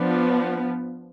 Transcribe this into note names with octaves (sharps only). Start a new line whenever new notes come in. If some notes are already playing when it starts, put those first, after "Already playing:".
Already playing: F3 B3 D4